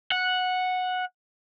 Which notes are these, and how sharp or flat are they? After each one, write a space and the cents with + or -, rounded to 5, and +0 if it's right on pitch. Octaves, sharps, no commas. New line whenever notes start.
F#5 -10